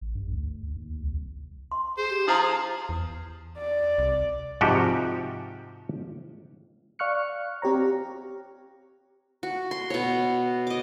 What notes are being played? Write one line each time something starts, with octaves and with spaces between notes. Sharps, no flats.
A1
G2
D2
D#2
C2
C6
G#4 C5
G4
F3 E4 G#4 C5 A#5
E2
D5
C2
G#2 C3 F3 F#4 G4
D5 F5 C#6 F6 F#6 C#7
C4 G4 C#5 A#5
G4
F#4
C6
B2 C#5
D#5 D6